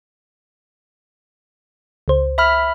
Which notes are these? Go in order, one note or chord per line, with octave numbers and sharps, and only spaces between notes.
C#2 C5
E5 B5 F6